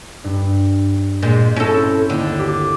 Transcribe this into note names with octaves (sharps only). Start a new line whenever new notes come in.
G2
A#2 G#3 G6 B6
C4 C#4 E4 A4 A#6
D#2 D3
G4 D6